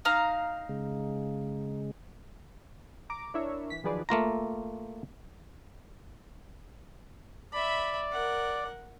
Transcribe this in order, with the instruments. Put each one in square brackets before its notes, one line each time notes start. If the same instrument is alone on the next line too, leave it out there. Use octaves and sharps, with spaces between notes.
[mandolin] D#4 F5 A#5
[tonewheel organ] C#3 G#3
[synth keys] A#5 D6
D4 E4 A#4 C#5 E5
E3 B6
D#3 F3 F#3 G#4 B4 D5
[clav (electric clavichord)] A3 A#3 F4 A#5
[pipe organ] D5 [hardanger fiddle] E5 B5
[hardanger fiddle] A#4 F#5